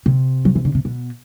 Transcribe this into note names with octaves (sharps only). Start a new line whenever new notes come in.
C3
F#3
E3
D3
C3
B2